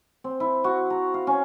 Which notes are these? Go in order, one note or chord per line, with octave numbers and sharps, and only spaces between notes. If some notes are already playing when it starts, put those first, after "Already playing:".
C4
E4
F#4
A#5
F5
C#4